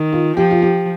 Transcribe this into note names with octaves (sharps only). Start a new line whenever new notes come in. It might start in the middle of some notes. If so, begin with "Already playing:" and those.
Already playing: D#3
F4
F3 G4
F4
G4